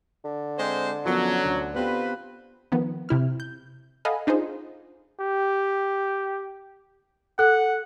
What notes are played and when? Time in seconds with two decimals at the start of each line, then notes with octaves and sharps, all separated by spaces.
0.25 D3
0.58 G#3 C4 C5
1.05 F#2 F3 F#3 B3
1.45 D2
1.75 B3 C4 F4 G4 B4
2.72 D#3 F3 B3
3.09 C3 E4 F6
3.40 G6
4.05 A4 D#5 F5 F#5 G#5 B5
4.27 D4 D#4 F4 G#4 C5
5.20 G4
7.39 A4 F#5 F#6